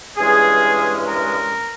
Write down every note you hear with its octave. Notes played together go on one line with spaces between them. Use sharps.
G2 E3 G#3 C#4 G#4
A#4